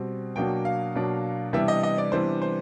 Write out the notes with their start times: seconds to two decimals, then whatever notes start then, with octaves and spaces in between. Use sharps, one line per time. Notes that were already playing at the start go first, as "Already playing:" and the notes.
Already playing: B2 G3 C4
0.36 B2 F#3 A#3 D4 G5
0.65 F5
0.95 B2 F#3 A#3 D4
1.53 C3 E3 G3 B3 D4 E5
1.68 D#5
1.83 D#5
1.98 D5
2.12 C3 E3 G3 B3 D4 C5
2.42 C5